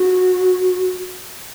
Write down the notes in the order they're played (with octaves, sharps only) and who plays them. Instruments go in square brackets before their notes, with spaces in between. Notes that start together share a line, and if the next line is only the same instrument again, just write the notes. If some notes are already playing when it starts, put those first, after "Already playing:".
Already playing: [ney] F#4